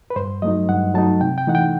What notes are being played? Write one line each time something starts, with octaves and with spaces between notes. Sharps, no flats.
B4
G2 C5
F#3 A3 D#4 D#5
G2 F#5
F#3 A3 D#4 A5
C3 G5
G5
E3 A3 D#4 F#5
G5